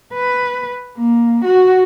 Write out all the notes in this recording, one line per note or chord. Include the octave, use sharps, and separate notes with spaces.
B4
A#3
F#4